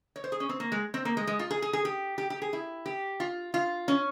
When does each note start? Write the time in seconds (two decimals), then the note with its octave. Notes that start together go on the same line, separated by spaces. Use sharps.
0.16 C#5
0.24 C5
0.32 G#4
0.40 C#4
0.49 C4
0.60 A#3
0.72 G#3
0.94 C4
1.05 A#3
1.17 G#3
1.27 G#3
1.39 F4
1.51 G#4
1.62 G#4
1.73 G#4
1.85 G4
2.18 G4
2.30 G4
2.42 G#4
2.53 E4
2.86 G4
3.20 F4
3.54 F4
3.88 C#4